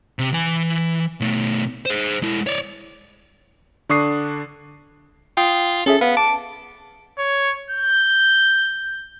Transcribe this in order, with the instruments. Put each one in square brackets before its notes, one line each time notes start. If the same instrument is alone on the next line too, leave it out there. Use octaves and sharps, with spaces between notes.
[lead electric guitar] C3
E3 G#5
B2 A3
G#4 C5
G#3 E4
C#5 D5
[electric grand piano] D3 D4 C#6 D#6 C7
[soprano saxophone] F4 [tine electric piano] G5 D#6
[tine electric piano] C#4 G#4 E5 [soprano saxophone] A4
[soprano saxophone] B3 [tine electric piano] F5
[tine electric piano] A5 [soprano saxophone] D6
[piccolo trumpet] C#5
G6